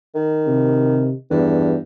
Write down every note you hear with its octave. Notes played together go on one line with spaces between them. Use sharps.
D#3
C3
E2 G2